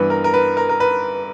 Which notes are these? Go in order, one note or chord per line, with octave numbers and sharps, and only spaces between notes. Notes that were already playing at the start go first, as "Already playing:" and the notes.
Already playing: G2 E3 B3 B4
A#4
A#4
B4
A#4
A#4
B4